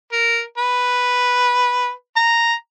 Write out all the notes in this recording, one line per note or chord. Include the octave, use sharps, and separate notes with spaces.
A#4
B4
A#5